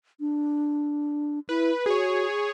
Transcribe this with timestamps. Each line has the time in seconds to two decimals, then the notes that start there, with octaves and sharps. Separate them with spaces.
0.20 D4
1.49 E4 B4
1.86 F#4 G#4 C#5